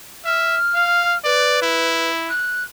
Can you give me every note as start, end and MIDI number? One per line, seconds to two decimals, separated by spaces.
0.25 0.57 76
0.25 1.17 89
0.75 1.15 77
1.24 2.10 71
1.24 1.59 74
1.62 2.29 64
2.29 2.63 90